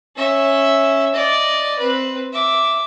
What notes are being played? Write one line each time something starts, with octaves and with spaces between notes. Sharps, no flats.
C#4 E5
D5 D#5
C4 B4
E5 D6